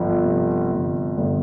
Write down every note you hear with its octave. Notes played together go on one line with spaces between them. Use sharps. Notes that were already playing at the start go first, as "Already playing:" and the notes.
Already playing: G1 F3
C3
G1
G1